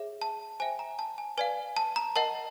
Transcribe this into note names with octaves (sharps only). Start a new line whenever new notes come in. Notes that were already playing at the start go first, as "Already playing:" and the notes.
Already playing: G#4 C#5 E5
A5
C5 E5 G5 G#5
A#5
A5
G#5
B4 D5 F5 G#5
A5
A#5
A#4 D#5 F#5 A5